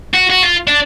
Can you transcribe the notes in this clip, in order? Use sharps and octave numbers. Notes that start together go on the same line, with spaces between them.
F#4
F#4
F4
D4